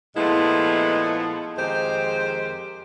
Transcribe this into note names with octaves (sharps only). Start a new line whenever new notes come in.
A#2 F3 G#3 A3 B3 E4
F2 D#3 G#3 G4 C5